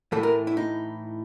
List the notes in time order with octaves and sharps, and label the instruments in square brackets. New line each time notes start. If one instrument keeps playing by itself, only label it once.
[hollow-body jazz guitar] A2 E3 A3 A4
A#4
E4
D#4